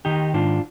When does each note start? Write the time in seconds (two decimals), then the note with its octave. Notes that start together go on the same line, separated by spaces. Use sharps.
0.05 D#3 D#4 G4
0.34 G#2 D4 F4